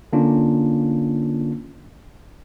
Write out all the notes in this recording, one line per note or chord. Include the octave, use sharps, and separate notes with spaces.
D3 A#3 C#4 D4 F4